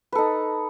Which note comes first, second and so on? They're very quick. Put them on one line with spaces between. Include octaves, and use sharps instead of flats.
B4 A4 D#4